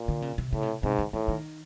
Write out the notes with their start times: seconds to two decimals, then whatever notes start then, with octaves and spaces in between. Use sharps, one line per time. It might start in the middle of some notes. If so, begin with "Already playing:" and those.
Already playing: A#2
0.08 D3
0.22 C#3
0.38 C3
0.53 A2 C#3
0.63 C3
0.83 G#2 C3
0.99 D3
1.13 A2 D#3
1.28 D#3